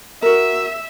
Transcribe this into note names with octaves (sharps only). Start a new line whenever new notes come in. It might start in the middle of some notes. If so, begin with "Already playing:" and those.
F#4 A#4 E5